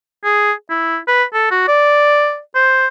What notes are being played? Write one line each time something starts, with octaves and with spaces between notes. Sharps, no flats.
G#4
E4
B4
A4
F#4
D5
C5